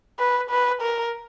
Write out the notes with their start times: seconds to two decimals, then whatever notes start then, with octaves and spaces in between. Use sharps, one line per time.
0.19 B4
0.50 B4
0.82 A#4